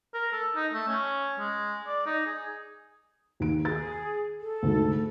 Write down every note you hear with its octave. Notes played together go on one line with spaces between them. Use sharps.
A#4
A4
D#4
A3
C#4
G#3
D5
D#4
G#4
D#2 D7
G#4 A6
A4
D2 G#2